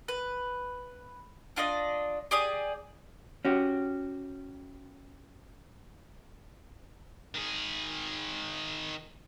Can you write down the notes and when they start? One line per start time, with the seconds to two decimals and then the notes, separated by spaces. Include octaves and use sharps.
0.08 B4
1.56 D4 F4 D5 D#5
2.31 G4 G#4 D5 D#6
3.45 C#4 F#4 G4
7.35 D#3 G#4